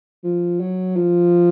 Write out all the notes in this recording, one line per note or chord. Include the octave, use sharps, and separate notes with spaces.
F3
F#3
F3